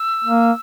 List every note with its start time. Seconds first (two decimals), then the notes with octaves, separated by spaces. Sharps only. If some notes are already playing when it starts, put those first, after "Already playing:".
Already playing: E6
0.25 A#3